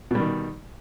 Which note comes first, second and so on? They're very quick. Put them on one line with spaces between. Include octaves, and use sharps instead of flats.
B2 G3 D#3